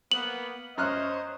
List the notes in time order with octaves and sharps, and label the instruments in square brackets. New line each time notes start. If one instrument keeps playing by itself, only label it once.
[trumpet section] A#3 B3 [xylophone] F#7
[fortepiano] F#2 F6 F#6 [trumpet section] C5 C#5 D#5